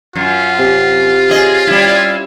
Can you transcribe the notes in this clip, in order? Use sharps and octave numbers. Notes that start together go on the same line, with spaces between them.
F#2 F4
C3 G4 G#5
G#4 C#5 D#5
G3 C#4 E4